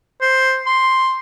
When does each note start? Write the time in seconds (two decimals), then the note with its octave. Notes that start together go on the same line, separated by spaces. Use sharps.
0.21 C5
0.66 C6